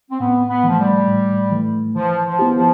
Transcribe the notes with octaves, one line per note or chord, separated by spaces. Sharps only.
C4
A2 B3
B3
E3 F3 A3
G3
A2
E3 A3
E3 F3
F3
B3 E4 G4
F3